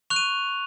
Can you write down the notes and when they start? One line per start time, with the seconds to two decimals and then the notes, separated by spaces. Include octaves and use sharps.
0.10 C#6 F#6 F7
0.16 D#7